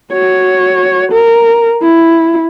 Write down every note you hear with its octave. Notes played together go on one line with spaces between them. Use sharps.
F#4 C#5
A#4
E4